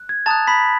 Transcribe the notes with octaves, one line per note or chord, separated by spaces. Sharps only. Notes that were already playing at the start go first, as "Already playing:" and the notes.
Already playing: F#6
G#6
A5 A#5 D#6 F#6 A6
B5 B6